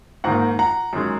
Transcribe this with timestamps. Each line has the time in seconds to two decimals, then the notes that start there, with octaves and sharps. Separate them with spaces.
0.24 G#2 D#3 A#3 F#5 A#5
0.59 F#5 A#5
0.93 F#2 D#3 G#3